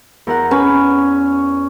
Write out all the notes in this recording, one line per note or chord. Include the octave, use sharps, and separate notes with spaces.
E2 A#4 F#5
C#4 B4 G#5 B5